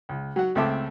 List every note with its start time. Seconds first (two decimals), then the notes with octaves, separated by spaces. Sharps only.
0.09 C#2
0.36 F#3 F#5
0.55 C#2 A3 C4 A4 E5 D6